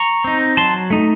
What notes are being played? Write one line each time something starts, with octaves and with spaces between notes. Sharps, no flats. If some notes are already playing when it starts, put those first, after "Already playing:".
Already playing: A#5 C#6
C4 D#4
F#3 A5 C6
A3 D#4